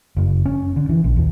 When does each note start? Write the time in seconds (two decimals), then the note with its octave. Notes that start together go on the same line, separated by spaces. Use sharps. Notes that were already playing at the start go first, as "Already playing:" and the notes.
0.17 F#1
0.45 C#4
0.76 D3
0.89 E3
1.04 A#1
1.17 D#2